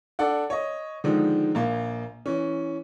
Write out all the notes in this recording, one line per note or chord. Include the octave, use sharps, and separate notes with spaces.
D4 A4 D5 F#5
C#5 D#5
D3 D#3 F3 G#3 D#4
A#1 A#3
E3 C#4